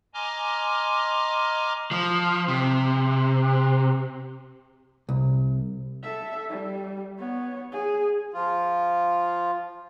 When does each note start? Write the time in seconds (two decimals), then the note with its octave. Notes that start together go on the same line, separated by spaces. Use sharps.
0.14 D#5 G#5 A#5 C6 D6 F6
1.91 F3
2.48 C3
5.09 C2
6.03 A4 E5
6.49 G3
7.19 B3 C#5
7.72 G#4
8.34 F3 F4